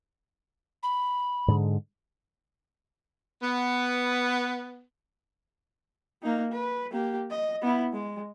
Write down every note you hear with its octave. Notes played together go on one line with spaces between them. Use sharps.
B5
G#2 D3 G#3
B3
A#3 D#4
B4
A#3 G4
D#5
B3 E4
G#3